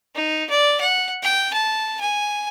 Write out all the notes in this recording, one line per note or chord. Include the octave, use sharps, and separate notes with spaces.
D#4
D5
F#5
G5
A5
G#5